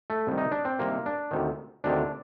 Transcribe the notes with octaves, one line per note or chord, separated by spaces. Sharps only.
A3
C2 C3 D#3
D#4
D4
C4
C2 C3 D#3 A#3
D4
D2 C3 D#3
D2 C3 D#3 D4